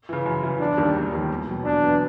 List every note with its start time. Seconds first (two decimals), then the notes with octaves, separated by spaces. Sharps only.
0.09 C#3 E3
0.26 F#2
0.43 C#3 E3
0.60 E1 D4
0.78 D#2 D#3 G3 A#3
0.95 E1
1.13 D#2 D#3 G3 A#3
1.30 E2
1.47 B2 F#3 B3
1.65 E2 D4
1.82 B2 F#3 B3